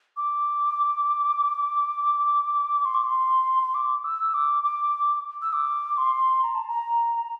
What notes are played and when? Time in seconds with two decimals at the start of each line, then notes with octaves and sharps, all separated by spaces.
0.17 D6
2.85 C6
2.94 D6
3.04 C6
3.63 C6
3.74 D6
4.04 E6
4.34 D6
4.64 D6
5.42 E6
5.53 D6
5.98 C6
6.42 A#5
6.55 A5
6.68 A#5